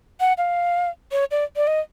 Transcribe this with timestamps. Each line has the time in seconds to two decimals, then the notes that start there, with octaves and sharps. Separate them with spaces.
0.20 F#5
0.38 F5
1.12 C#5
1.31 D5
1.56 D5
1.67 D#5